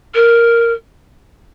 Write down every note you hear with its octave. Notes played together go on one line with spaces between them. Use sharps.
A#4